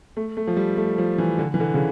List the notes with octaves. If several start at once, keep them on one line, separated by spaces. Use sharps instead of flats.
A3
A3
F3
G3
A3
F3
E3
D3
E3
D3
C#3